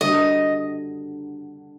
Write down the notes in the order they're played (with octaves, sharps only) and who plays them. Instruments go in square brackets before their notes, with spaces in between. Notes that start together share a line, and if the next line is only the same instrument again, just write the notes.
[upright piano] D3 G3 D4 F#4 [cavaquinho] D#5